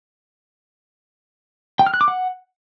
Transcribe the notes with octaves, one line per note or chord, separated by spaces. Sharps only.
G5
F6
F#6
D6
F#5